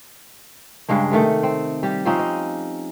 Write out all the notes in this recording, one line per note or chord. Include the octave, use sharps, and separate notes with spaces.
G2 C#3 G#3 D4
C3 D#3 A3
C4
G3 G4
F3 C4 C#4 D#4
D#5